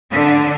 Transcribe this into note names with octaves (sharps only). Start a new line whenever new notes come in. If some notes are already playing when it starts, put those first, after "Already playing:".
D3